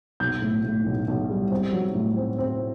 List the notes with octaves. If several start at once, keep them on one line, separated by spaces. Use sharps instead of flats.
B1 G6
A2
A2
B1
B1
G3
C4
F#3
A2
C4
C4